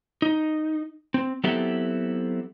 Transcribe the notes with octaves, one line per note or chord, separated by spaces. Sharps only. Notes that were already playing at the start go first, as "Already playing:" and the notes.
D#4
C4
F#3 B3 C4 E4 G4 A4